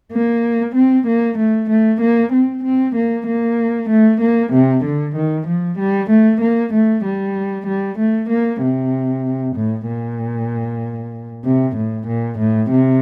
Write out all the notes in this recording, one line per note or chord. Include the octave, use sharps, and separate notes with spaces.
A#3
C4
A#3
A3
A3
A#3
C4
C4
A#3
A#3
A3
A#3
C3
D3
D#3
F3
G3
A3
A#3
A3
G3
G3
A3
A#3
C3
A2
A#2
C3
A2
A#2
A2
C3